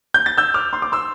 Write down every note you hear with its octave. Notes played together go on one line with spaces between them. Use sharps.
G6
A6
E6 G6
D6 F6
C6
D6
C6 E6